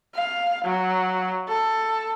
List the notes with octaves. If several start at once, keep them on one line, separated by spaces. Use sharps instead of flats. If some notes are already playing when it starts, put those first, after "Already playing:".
F5
F#3
A4